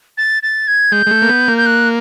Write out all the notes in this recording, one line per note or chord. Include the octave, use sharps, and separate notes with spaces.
A6
A6
G#6
G#3 G6
G#3
A3
A#3
B3
A#3
G6
F#6